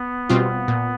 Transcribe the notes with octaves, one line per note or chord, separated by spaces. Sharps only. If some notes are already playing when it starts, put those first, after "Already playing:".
Already playing: B3
B2 G3 C4 F4
A#2